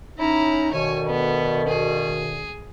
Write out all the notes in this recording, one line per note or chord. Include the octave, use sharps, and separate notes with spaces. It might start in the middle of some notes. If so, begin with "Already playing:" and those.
C#4 D#4 E4 A#5
D2 B2 D#3 C#5 G#5
B3
G#4